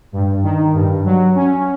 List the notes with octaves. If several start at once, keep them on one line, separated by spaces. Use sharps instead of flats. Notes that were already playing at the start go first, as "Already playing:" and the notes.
G2
D#3
G2
F#3
C#4